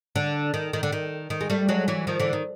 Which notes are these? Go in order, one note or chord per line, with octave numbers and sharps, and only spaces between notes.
D3
D#3
D#3
D3
D#3
D#3
G#3
G3 A3
F#3 G#3
E3 F#3
D#3 F3
D3 E3
D#3